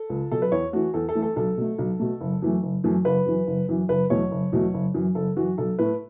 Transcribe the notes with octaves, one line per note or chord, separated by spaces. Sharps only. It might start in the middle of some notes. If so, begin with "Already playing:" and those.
Already playing: A4
C#2
B2 F#3 A4
B4
E2 C#5
E3 A3 F#4
E2 A4
A4
E3 A3
A4
B1 A4
B2 A3
B1
B2 A3
F#1
F#2 E3 A3
F#1
F#2 E3 A3
F#1 B4
F#2 E3
F#1
F#2 E3
F#1 B4
E2 B2 F#3 A3 C#5
F#1
E2 B2 F#3 A3
F#1
F#2 E3
F#1 A4
F#2 E3 F#4
B1 A4
A2 A3 B4